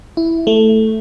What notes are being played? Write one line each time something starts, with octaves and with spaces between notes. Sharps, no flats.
E4
A3